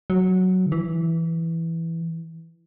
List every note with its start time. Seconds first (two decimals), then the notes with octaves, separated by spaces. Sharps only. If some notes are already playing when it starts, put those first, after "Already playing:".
0.10 F#3
0.66 D3
0.72 E3